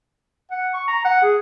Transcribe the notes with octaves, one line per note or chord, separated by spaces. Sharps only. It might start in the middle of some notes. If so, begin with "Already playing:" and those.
F#5
C#6
A#5
F#5
G#4